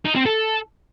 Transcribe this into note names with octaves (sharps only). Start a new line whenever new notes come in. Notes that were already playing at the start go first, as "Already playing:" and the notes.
D#4
C4
A4